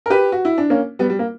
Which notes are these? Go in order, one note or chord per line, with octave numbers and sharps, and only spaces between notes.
A#4
G4 B4
F#4
E4
D4
A#3 C#4
G3 B3
G3
A#3